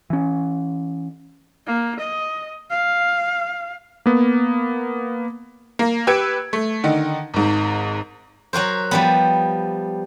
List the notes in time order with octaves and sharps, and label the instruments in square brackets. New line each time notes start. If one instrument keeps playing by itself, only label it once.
[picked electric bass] E3 C#4
[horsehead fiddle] A#3
D#5
F5
[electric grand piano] A#3 B3
[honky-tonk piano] A#3
G4 B4 E6 G#6 C#7 D7
A3
D3 D#3 D#4
G#1 G#2
[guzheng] F#3 F#4 A#4 C5
F3 G3 B3